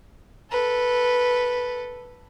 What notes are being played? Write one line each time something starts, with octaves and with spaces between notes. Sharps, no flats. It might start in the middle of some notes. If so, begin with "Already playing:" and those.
A4 B4